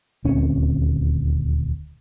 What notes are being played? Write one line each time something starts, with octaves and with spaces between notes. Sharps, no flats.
D#1 D2 C4 C#4